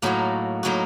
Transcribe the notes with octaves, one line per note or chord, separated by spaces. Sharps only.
A2 F#3 A#3 D#4 F#4
A2 F#3 A#3 D#4 F#4